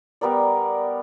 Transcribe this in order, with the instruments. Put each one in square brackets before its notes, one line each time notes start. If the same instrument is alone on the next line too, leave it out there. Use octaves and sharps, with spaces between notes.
[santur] G3 B3 A#4 D5